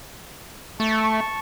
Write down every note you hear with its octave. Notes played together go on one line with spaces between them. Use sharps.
A3 A5 C#6